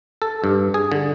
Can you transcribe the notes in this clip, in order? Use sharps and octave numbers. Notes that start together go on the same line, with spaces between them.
A4
G2
G#4
D3